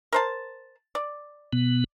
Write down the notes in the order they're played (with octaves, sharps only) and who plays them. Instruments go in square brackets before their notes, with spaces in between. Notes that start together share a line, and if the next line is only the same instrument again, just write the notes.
[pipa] A#4 C5 A5
D5
[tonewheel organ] B2 B3